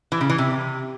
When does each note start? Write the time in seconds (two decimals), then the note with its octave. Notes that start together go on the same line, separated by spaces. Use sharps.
0.12 E3
0.21 C#3
0.30 E3
0.38 C3